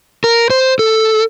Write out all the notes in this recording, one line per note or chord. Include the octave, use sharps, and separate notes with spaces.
A#4
C5
A4